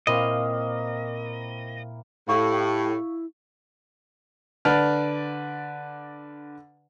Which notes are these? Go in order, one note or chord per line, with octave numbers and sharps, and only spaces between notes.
A#2 A#3 C4 E4 D#5 F5
A2 E4 G4 F5 C#6
D3 B4 D5 A5 F6